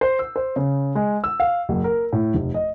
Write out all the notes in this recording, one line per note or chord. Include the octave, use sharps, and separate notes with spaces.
C5
E6
C5
C#3
G#3
E6
F5
F#1
A#4
A2
F1
D#5